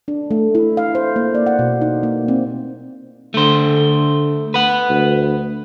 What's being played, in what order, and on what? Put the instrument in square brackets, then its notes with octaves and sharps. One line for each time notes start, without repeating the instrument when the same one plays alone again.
[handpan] D4
A3
E4
F5
C5
A#3
D5
F#5
B2
D#4
A#3
C4
[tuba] D3 [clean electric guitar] A3 C5
[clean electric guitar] B4 F#5
[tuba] D2